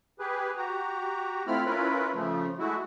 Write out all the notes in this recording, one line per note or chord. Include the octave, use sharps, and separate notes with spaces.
G4 G#4 B4
F#4 G4 A#5
A3 C4 E4 F4 B5 F6
C#4 E4 F4 A#4 B4 B5
C#3 F3 A3
G#3 A3 E4 F#4